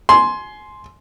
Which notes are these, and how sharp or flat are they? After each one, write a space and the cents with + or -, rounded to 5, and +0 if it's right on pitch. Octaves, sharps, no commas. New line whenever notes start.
G#5 +25 C6 +0